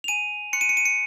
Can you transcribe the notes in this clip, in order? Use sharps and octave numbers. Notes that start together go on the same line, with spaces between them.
F7
G#5 D#7
C6 F#6 C#7
D#7
C#7
D#7
C#7